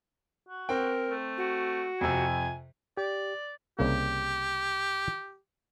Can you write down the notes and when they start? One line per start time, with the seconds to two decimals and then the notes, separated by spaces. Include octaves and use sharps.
0.49 F#4
0.69 C4 A#4 G5
1.11 A3
1.38 F#4
2.01 F2 C3 G#5
2.97 G4 D5
3.79 C2 C#3 A#3 G4